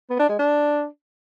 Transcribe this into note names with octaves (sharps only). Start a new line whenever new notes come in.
B3
D4
G#3
D4